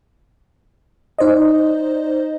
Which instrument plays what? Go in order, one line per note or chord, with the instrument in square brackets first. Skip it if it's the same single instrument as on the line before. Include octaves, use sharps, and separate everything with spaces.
[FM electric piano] D#4 C5 D5 D#5